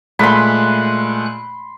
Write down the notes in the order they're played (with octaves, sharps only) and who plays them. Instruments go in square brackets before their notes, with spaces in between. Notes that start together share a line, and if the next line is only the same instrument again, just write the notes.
[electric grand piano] A#2 G#3 A3 [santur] B5 C6 [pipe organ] F#6